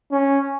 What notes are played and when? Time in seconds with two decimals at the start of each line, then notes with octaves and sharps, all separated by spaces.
0.12 C#4